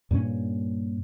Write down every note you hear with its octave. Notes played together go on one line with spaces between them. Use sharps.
G2 A#2 B3 C#4